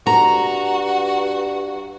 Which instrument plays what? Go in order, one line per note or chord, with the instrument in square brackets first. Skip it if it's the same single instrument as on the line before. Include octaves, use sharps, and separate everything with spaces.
[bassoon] G2 [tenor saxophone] F#4 [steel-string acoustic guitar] A#5